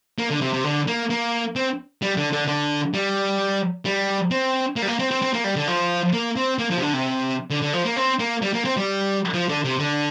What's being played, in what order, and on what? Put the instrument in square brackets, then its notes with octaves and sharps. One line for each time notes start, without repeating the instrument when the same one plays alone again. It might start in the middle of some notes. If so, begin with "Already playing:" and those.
[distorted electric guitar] A#3
D3
C3
C3
D3
A#3
A#3
C4
G3
D3
D3
D3
G3
G3
C4
A#3
G3
A#3
C4
C4
C4
A#3
G3
D3
F3
A#3
C4
A#3
F3
C3
D3
C3
D3
D3
F3
A#3
C4
A#3
G3
A#3
C4
G3
F3
D3
C3
D3